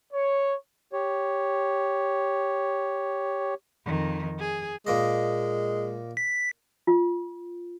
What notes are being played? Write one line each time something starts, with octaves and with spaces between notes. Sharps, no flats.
C#5
G4 C#5
F2 D#3
G#4
A#2 G#3 A#3 D#5
B6
F4